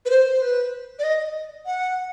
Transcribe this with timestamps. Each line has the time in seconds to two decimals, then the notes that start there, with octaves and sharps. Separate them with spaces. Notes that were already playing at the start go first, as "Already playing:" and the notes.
0.06 B4
0.10 C5
0.33 C5
0.41 B4
0.99 D5
1.04 D#5
1.66 F#5